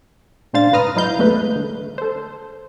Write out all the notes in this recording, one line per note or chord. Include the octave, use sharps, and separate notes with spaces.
A#1 G#3 D4 C5 F5 A6
C#2 G#2 B4 A#5 D#6 F6
F#3 D#4 E4 F5 G6
A1 E2 G#3 A3 B4
D3
A4 C5